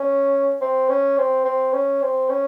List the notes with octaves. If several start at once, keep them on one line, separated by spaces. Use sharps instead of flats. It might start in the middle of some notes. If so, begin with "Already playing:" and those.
Already playing: C#4
C4
C#4
C4
C4
C#4
C4
C#4